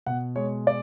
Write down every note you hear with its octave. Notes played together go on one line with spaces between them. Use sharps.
B2 F#5
G#3 C#5
D5